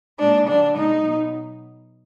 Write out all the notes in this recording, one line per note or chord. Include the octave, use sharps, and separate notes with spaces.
A#2 G#3 D4
D3 F#3 D4
B2 G#3 D#4
B2 F#3